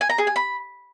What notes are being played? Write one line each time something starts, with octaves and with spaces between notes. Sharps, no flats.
G#5
A#5
G#4
G#5
B5